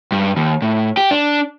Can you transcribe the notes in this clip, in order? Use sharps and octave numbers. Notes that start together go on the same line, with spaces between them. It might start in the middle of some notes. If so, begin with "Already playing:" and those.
G2
D#2
A2
G4
D4